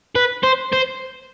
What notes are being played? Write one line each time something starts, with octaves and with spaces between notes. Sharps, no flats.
B4
C5
C5